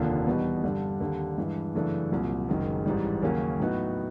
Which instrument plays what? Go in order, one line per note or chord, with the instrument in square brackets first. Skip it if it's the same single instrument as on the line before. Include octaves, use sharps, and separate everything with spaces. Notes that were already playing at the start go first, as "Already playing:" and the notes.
Already playing: [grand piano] F1 D#2 D3 F3 A#3
E2 B2 G3 B3 D#4
G2 D3 G3
D#2 D3 G3
G2 E3 G#3
F#2 C#3 E3 A3 D4
C2 A#2 F#3
F#1 F#2 D#3 G#3
A1 G#2 E3 G3
D#2 C#3 F#3 A#3 C#4
A2 F#3 B3 D#4 F#4